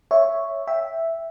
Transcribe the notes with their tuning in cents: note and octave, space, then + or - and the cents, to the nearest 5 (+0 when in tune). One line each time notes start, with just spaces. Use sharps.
C#5 +0 E5 +0
E5 +0 G5 +0